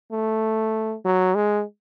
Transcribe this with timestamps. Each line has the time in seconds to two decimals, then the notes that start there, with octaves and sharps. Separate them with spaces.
0.12 A3
1.05 F#3
1.35 G#3